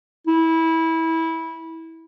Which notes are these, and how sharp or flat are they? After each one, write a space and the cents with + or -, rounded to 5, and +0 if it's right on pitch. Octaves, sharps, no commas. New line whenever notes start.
E4 -20